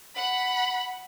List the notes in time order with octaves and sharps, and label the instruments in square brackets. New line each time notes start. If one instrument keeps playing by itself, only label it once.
[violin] F#5 B5